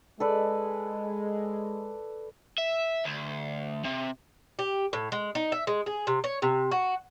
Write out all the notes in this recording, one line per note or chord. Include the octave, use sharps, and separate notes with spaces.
G#3 A4 B4 D5
E5
D2
C3
G4
A2
G#3
D#4
E5
G#3
G#4
C3
C#5
C3
F#4